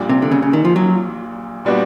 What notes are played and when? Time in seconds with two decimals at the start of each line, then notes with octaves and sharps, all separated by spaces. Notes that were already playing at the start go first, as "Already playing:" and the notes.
Already playing: A#1 A#2 G3
0.09 C3
0.22 D3
0.31 C#3
0.42 C#3
0.53 D#3
0.65 F3
0.76 F#3
1.65 A#2 G3 B3 D4 F#4